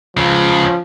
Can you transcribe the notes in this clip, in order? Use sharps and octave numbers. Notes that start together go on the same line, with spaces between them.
C#2 C#3 F3